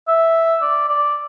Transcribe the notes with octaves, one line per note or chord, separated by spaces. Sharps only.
E5
D5
D5